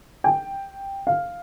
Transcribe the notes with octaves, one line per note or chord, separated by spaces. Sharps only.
G5
F5